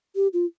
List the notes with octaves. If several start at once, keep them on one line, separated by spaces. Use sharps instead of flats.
G4
F4